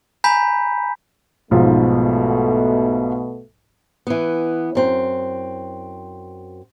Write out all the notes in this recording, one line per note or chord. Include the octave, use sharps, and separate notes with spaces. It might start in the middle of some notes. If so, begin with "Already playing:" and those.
G#5 A#5 B5 G6 B6
B1 G#2 B2 F3 A3
E3 B3
F#2 C4